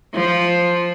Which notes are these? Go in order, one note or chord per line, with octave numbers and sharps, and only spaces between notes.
F3